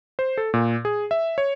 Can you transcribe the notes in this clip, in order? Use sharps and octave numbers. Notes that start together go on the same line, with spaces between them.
C5
A4
A#2
G#4
E5
C#5